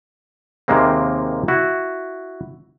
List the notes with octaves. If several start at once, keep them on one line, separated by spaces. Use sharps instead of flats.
D#2 C3 D#3 G#3 A#3 C4
E4 F#4